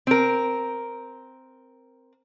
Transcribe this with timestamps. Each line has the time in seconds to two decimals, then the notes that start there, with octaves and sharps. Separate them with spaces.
0.07 C4 A#4